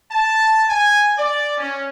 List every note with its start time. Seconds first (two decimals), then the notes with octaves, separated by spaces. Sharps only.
0.11 A5
0.69 G#5
1.18 D5
1.58 C#4